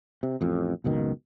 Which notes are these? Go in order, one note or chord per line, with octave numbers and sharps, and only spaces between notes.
C3
A1 F2
F#1 C#2 B2 D#3